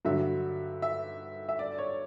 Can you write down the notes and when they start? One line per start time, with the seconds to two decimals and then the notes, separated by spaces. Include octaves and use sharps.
0.05 G2 D3 F#3 E5
0.82 E5
1.49 E5
1.59 D5
1.78 C#5